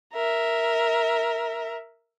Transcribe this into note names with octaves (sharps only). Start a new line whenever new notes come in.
A#4 E5